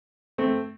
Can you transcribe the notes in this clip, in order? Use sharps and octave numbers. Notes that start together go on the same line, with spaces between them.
A3 C4